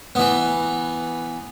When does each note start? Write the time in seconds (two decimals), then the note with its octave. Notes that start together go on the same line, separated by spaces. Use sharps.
0.15 E3 B3